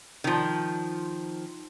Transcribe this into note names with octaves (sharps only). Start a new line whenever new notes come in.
D#3 F3